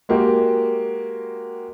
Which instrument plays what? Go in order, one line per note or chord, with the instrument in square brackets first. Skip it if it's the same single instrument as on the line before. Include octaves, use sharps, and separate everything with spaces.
[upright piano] G#3 A#3 F#4 G4